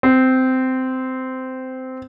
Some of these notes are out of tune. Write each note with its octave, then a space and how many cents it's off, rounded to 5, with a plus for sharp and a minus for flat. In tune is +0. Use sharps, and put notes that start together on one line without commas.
C4 -15